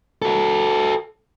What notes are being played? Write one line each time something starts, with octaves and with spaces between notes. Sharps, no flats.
F#4 A4